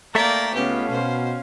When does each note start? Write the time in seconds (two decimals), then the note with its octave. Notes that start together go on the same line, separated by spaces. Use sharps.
0.15 A3 A#3 A4 D5 E5 G5 A#5
0.54 C#2 B3 C#4 G4 F5
0.90 B2 C5